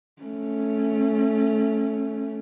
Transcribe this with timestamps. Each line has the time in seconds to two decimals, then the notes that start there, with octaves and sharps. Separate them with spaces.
0.22 A3 C#4